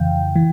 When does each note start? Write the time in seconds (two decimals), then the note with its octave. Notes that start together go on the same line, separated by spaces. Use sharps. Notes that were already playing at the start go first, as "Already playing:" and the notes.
Already playing: F2 C#3 E3 F5 G5
0.36 E3